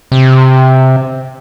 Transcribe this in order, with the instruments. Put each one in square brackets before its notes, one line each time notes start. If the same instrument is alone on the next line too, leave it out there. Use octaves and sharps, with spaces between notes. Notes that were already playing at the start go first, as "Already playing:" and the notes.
[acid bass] C3